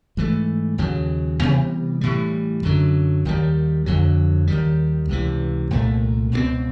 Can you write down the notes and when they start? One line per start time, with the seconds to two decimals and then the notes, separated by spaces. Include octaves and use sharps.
0.17 G#2 E3 A3
0.78 D#2 C#3 F#3
1.40 C3 E3 G3 B3
2.01 A2 E3 G3
2.63 F#2 D3 F#3
3.25 D#2 D#3 G3
3.86 F2 D3 F#3
4.47 D#2 D#3 G3
5.09 C#2 C3 E3
5.71 C2 A#2 F3 A3
6.32 C#2 B2 G3 C4